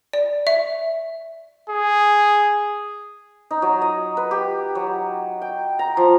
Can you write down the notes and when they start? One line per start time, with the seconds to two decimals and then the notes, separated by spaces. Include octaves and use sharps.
0.13 D5
0.47 E5
1.70 G#4
3.51 D#4
3.62 F#3
3.82 D#5
4.17 B4
4.31 G4
4.75 F#3
5.42 G5
5.79 A#5
5.97 F3